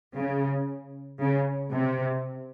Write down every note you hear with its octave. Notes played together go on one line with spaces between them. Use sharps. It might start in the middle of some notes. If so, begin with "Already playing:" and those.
C#3
C#3
C3